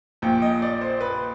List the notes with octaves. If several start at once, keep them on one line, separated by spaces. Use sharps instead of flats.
A#1 A#2 F3 G5
D#5
D5
C5
B4